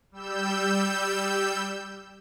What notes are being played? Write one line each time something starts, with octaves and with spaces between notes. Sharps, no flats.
G3 E6 G6